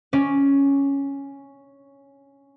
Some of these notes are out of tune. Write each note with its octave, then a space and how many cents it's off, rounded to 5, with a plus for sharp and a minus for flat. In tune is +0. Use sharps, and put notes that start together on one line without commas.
C#4 +0 D5 +0